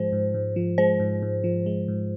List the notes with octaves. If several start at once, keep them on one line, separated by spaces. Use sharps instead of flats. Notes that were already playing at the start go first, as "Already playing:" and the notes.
Already playing: G#2 F3 G#3 C5
G#2
G#2
F3
G#3 C5
G#2
G#2
F3
G#3
G#2